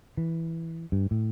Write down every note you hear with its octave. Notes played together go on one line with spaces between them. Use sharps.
E3
G2
A2